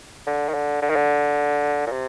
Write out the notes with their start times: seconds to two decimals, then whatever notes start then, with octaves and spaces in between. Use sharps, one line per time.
0.27 D3
0.49 D#3
0.54 D3
0.82 D3
0.89 D#3
0.96 D3
1.87 A#2
1.92 C3